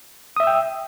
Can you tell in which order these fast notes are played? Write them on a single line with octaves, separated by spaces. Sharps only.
D#6 E5 E6 G5